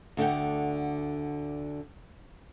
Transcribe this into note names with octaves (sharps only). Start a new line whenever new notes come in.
D2 D3 F#5 G5